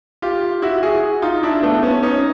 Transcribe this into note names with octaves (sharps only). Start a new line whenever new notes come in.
F4 G4
E4 F#4
F#4 G#4
D#4 F4
D4 E4
A3 B3
B3 C#4
C#4 D#4